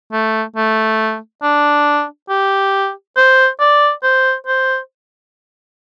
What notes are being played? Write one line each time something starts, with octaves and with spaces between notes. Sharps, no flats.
A3
A3
D4
G4
C5
D5
C5
C5